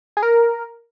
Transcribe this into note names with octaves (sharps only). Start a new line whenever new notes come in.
G#4
A#4